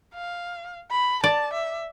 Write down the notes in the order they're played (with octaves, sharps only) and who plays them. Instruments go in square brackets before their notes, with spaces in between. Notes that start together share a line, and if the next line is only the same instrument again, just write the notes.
[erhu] F5
B5
[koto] D5 [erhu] A5
[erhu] E5